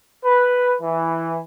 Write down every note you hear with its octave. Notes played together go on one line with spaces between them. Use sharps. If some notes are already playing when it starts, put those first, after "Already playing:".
B4
E3